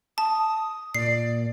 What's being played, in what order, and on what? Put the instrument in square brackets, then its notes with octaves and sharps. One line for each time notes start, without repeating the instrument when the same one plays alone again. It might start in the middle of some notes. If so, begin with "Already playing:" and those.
[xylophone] A5 [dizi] D#6
[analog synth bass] A#2 [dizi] D5 [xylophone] C7